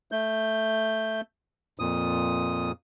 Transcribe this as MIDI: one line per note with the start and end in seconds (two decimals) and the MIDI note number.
0.12 1.21 57
0.12 1.21 91
1.79 2.71 41
1.79 2.71 46
1.79 2.71 87